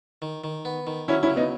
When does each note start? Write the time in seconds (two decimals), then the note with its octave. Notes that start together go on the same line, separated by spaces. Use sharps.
0.22 D#3
0.44 D#3
0.65 B3
0.87 D#3
1.08 F#3 C#4 E4
1.23 C#4 E4
1.30 C#3
1.36 B3 D#4